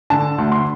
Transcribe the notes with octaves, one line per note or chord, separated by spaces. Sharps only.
D3 A5
D2
C6